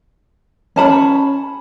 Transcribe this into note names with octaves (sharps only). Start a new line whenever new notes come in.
C#4 A5 B5